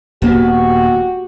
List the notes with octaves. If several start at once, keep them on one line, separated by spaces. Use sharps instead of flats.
D#1 A#3 B3 F#4 G4